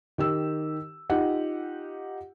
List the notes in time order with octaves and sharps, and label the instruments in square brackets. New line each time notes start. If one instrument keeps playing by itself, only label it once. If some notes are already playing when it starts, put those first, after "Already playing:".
[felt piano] D#3 G4 E6
D#4 F4 G4 F#5